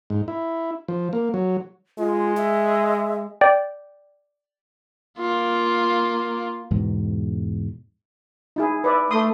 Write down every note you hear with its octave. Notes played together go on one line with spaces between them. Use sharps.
G#2
E4
F3
A#3
F#3
G#3 F4
E5
D5 G5
A#3 F4
E2 G#2 B2 G#3
D#4 E4 G#4
B4 D5 E5
A3 C6 D#6